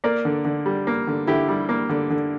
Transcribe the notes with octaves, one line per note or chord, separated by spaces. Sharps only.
A#3 A#4 D5
D3
D3
G3
A#3
D3
D3 E4 G4
G3
A#3
D3
D3